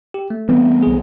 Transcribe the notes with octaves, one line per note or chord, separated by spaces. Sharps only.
G4
A3
E3 G3 B3 C4
B1 G#4